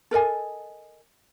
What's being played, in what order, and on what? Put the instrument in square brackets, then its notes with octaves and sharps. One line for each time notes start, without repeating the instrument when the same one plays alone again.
[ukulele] A4 A#4 D#5 G#5